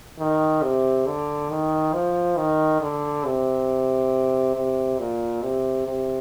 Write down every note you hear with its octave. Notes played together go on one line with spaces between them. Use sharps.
D#3
C3
D3
D#3
F3
D#3
D3
C3
C3
A#2
C3
C3